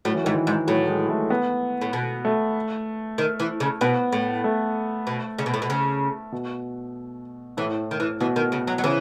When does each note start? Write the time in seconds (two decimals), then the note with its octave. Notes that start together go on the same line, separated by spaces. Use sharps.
0.05 A2 F#3
0.15 E3
0.24 G#2 D#3
0.34 E3
0.47 G#2
0.67 A2 F#3
0.88 G#3
1.09 A3
1.30 B3
1.81 A2
1.93 B2
2.25 A3
3.18 D#3
3.40 E3
3.60 C#3
3.81 B2 B3
4.12 A2
4.44 A3
5.07 B2
5.38 C#3
5.46 B2
5.54 A2
5.62 B2
5.70 C#3
6.32 B2
7.57 A2 E3
7.91 D#3
8.00 E3
8.21 B2 E3
8.36 D#3
8.52 C#3
8.67 F#3
8.78 F#3
8.83 C#3 E3